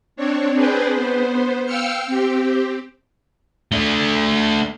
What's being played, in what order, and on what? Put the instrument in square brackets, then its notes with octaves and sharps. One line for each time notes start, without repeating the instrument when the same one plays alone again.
[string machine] C4 D4 C#5
C4 D4 G#4 B4 C5
B3 C5
F5 G5 E6 F6 C#7
C4 G4
[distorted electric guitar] A3 D4